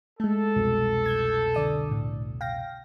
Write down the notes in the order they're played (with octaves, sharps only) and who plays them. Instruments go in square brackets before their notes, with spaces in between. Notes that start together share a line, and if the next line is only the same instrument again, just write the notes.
[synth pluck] G#3 A3 [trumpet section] A4
[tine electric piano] C2 F2 B2
[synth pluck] G6 G#6
D3 D5 D#6
A2
F5 G5 A#6